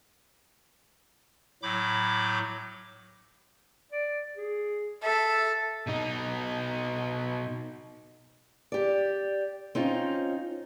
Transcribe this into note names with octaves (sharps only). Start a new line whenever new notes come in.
A2 F#3 B5 D6 G6
D5
G#4
A4 E5
B2 D#4
G4 D5
C4 C#4 D#4 F4